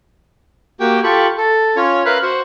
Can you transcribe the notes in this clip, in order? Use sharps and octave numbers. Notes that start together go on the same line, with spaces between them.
A#3 F#4 G4 G5
F4 G4 A4 B5 C#6
A4
C#4 F4 C#5
A#4 B4 E5 F5 B5 F#6
F#4 C5 F#5